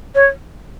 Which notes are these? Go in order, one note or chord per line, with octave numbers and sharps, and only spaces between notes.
C#5